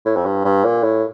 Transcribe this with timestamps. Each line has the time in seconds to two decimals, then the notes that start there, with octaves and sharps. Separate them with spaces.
0.05 A2
0.16 F2
0.25 G2
0.45 G2
0.65 A#2
0.83 A2